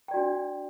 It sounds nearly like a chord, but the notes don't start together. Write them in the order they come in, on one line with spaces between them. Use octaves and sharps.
G5 D5 F#4 D4